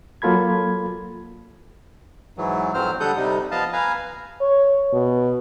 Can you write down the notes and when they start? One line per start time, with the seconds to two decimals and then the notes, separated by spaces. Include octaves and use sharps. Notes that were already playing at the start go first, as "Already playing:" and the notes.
0.22 F#3 A#3 F4 A4 B5 G#6
2.38 G#2 E3 F#3
2.74 F2 G#2 F#3 C4 C5 F6
3.00 D3 G3 A4 F#5 D#6 G6
3.17 C3 G3 D#4
3.51 F3 B3 D#5 F5 A5
3.73 B4 F5 G#5 A#5
4.41 C#5
4.93 B2